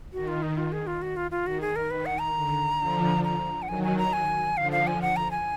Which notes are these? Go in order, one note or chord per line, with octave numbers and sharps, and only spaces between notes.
D#3 F#4
F4
D#4
F4
G#4
F4
F#4
F4
F4
D#3 F#4
G#4
A#4
D#3 B4
F#5
A#5
D3
D3 F3
A#5
F#5
D#3 F#3 G#5
G#5
A#5
G#5
D3 F3 F5
F5
G#5
F#5
A#5
G#5